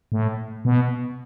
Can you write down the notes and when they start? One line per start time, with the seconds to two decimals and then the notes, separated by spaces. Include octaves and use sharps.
0.12 A2
0.65 B2